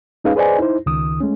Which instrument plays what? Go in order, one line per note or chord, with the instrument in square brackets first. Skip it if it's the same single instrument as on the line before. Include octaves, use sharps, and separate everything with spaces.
[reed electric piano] G#3 C#4 D#4 G#4 B4 F5
G#4 B4 C5 D5 D#5 G#5
D#4 E4 C5
C#2 D#3 D#6
G#3 A3 C#4